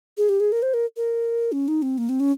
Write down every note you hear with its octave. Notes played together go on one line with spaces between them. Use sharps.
G#4
G4
G#4
A#4
C5
A#4
A#4
C#4
D#4
C4
A#3
C4
C#4